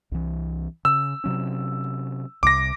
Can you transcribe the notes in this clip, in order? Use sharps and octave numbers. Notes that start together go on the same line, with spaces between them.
C2 E3
C#3 E6
C3 F#3 C#4
C2 C3 D6 A#6